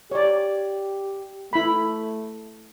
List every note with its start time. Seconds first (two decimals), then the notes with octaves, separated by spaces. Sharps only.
0.11 G4 C#5 D5
1.53 A3 E4 B5